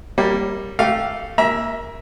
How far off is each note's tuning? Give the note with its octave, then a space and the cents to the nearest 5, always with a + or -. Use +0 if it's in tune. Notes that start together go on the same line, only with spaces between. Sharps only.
G3 +0 A#3 +0 C#5 -15
A3 +0 G4 -20 F5 +0
A#3 +0 E5 +0 A#5 +35